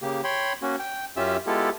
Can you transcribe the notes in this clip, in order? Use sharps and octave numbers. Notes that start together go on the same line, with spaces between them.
C#3 A#3 G4
C#5 G5 B5 C6
A#3 C#4 F#4
G5
F#2 C#4 F4 G4 E5 E6
G#3 B3 E4 F4 G4 A4